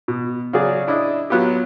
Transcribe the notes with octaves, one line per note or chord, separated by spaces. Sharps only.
B2
C#3 F#3 F#4 G#4 D5
D4 E4 D5 D#5
F#3 B3 F4 G4